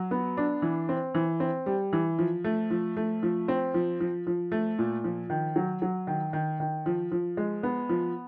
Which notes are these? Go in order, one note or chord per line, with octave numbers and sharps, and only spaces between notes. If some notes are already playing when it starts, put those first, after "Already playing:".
Already playing: F#3
B3
D4
E3
C4
E3
C4
G3
E3
F3
A3
F3
A3
F3
C4
F3
F3
F3
A3
A#2
F3
D#3
F#3
F#3
D#3
D#3
D#3
F3
F3
G#3
B3
F3